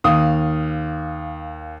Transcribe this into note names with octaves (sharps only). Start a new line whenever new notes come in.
D#2 F5 D#6